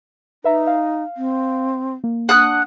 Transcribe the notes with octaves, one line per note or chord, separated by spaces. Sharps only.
D#4 B4 E5 A#5
F5
C4
A#3
D4 F#5 D#6 F#6